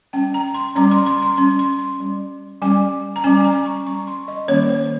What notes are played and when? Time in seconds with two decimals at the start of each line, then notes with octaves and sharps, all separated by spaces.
0.13 G3 C#4 G5
0.34 A#5
0.55 C6
0.75 G3 C#4 A#5
0.91 C6
1.06 C6
1.22 C6
1.37 G3 C#4 C6
1.59 C6
1.79 C6
2.00 G3 C#4
2.62 G3 C#4 G#5
3.16 A#5
3.24 G3 C#4 G#5
3.40 G#5
3.45 A#5
3.66 C#6
3.86 G3 C#4 C#6
3.98 C#6
4.07 C6
4.28 D#5
4.48 D#3 G3 A#3 C#4 C#5
4.69 C5